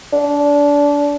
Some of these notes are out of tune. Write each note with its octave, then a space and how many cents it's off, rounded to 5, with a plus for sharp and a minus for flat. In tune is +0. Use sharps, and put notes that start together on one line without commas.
D4 -25